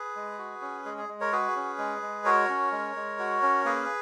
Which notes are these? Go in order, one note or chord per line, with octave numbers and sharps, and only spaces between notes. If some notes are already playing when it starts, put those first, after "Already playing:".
Already playing: G#4 B4
G#3
F#4
C#4
G#3 G#4
G#4
G#3
A#4 C#5
F#4 G#4 B4
C#4
G#3
G#3
F#4 A#4 C#5
C#4
G#3
G#3
F#4
C#4
A#3 G#4 B4